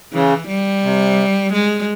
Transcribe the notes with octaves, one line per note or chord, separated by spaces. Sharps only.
C#3 E3
G3
C3
G#3